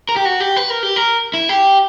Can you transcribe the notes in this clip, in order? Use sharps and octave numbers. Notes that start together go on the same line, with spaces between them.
A#4
G4
F#4
G4
B4
A#4
G4
A#4
E4
G4